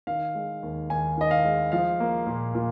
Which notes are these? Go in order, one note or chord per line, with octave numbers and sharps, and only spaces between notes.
D#3 F5
G#3
D#2
D#2 G#5
D#3 D#5
F5
G#3
F3 F5
A#3
A#2
A#2